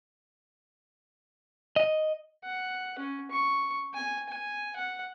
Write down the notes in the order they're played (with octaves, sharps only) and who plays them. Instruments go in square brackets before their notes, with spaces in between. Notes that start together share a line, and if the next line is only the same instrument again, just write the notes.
[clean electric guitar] D#5
[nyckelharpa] F#5
C#4
C#6
G#5
G#5
F#5